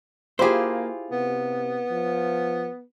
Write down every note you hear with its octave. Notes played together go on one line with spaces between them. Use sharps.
A#3 E4 F4 G4 G#4 C5
C3 B3
F3